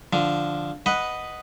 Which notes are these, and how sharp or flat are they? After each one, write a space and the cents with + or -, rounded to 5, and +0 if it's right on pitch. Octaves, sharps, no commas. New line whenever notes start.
D3 +0 F3 +0
B4 +0 D#5 +0 F#5 +0